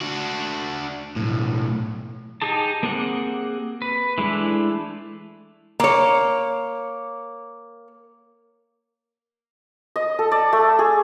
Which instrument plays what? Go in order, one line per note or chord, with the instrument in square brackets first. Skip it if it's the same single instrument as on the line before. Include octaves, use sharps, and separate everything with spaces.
[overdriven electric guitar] D4 F#4
B1 A2
[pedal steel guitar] D#4 G4 G#4 A5
A#3 C4 G4 G#4 F#5
B4
E3 G#3 A3 D4 E4
[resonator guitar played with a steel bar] A#3 C#5
[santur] D#5
A4
D5
A3
G#4